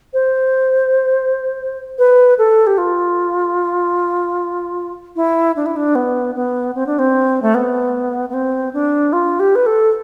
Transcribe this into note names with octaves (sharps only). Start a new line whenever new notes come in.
C5
B4
A4
G4
F4
E4
D4
E4
D4
B3
B3
C4
D4
C4
A3
B3
B3
C4
D4
F4
G4
B4
A4